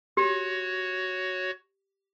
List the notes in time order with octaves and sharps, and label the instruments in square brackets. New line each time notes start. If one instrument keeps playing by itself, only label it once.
[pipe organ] F#4 C#5 [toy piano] G4